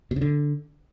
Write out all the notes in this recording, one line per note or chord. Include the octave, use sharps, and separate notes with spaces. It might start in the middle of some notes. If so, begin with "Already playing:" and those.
B2
C#3
D3